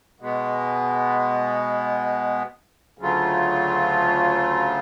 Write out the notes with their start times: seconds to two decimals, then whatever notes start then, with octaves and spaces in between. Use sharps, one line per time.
0.20 B2 G#3 B3
2.98 D2 C#3 F#3 A3 F4